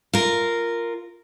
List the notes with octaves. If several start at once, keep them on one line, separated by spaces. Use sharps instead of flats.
F4 A#4